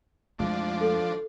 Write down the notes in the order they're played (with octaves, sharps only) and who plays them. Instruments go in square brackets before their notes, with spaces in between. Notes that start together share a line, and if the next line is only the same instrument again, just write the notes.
[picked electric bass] F2 G#3 A3 [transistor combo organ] F3 D4
[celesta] A4